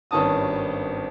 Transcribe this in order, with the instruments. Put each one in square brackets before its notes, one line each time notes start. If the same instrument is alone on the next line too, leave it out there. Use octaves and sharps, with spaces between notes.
[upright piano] G#1 G2 D#3 C#4 A5 D#6